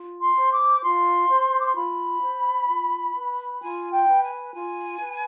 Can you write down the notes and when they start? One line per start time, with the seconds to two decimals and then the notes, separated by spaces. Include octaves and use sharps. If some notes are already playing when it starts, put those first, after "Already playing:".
Already playing: F4
0.20 C6
0.35 C5
0.50 D6
0.82 F4 C6
1.28 C5
1.58 D6
1.66 C6
1.75 F4 B5
2.21 C5
2.67 F4
3.14 B4
3.60 F4 G#5
3.92 G5
4.07 B4
4.23 G#5
4.54 F4 G#5
5.00 B4